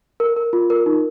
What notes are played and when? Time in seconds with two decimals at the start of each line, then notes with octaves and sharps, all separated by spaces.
0.20 A#4
0.36 A#4
0.53 F4
0.70 A#4
0.86 D#4